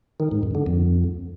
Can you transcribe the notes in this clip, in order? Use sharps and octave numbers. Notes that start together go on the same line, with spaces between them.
D#3
G#2
F#2
D3
F2